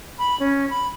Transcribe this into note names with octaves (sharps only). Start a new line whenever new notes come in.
B5
C#4
B5